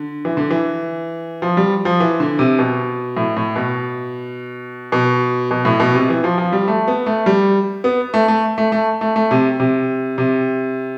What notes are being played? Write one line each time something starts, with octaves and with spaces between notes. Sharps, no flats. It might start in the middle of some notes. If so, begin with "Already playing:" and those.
Already playing: D3
E3
D3
E3
F3
G3
F3
E3
D3
C3
B2
A2
A2
B2
B2
B2
A2
B2
C3
E3
F3
F3
G3
A3
B3
A3
G3
B3
A3
A3
A3
A3
A3
A3
C3
C3
C3